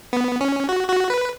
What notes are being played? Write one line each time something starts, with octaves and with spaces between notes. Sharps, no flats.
B3
C#4
F#4
F#4
B4